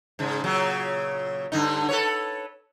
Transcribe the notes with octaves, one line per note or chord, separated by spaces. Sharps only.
G#2 C#3
A#2 C#3 F#3
G2 D3 D#4
A4 B4 C#5